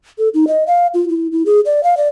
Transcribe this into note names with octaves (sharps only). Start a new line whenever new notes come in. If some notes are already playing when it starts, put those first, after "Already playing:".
A4
D#4
D#5
F5
F4
E4
E4
G#4
D5
F5
D5